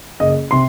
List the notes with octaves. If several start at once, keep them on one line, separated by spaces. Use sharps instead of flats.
F#1 D#5
C3 C6